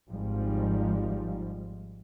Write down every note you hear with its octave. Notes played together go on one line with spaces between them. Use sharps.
G#1 G#2 F3 G3